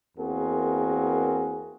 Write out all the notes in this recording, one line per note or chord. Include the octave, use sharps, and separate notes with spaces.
E2 A#3 C4 F#4 G#4 A#4